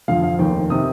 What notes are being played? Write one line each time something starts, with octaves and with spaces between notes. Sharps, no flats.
F2 D3 F3 F5
F5
F1 D#2 D#3 G5
C3 D#3 D#6